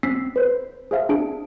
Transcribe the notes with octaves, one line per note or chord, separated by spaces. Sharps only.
C4 C#4 E6 B6 C7
B4 C5
G#4 C5 E5 F5
C4 D4 G#4 D7